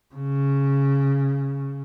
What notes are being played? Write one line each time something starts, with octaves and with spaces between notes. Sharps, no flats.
C#3